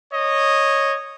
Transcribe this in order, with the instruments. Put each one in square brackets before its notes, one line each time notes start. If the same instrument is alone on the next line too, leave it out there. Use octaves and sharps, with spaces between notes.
[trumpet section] C#5 D#5